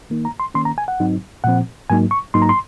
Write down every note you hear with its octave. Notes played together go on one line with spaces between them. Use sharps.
D#3 A#3 D#4
A#5
C6
D#3 A#3 C#4 C6
A#5
G#5
F#5
G#2 F#3 C4 D#4
A#2 F3 C4 F#5
G#2 F#3 A#3 D#4 G#5
C#6
G#2 F#3 A#3 D#4 C6
A#5
C6